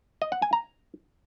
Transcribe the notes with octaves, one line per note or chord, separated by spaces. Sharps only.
D#5
F#5
G#5
A#5